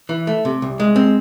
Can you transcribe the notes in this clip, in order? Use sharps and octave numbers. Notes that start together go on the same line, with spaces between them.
E3
A3
C3
C2
G#3
C4